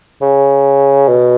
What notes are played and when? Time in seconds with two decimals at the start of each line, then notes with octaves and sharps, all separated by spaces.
0.22 C#3
1.08 B2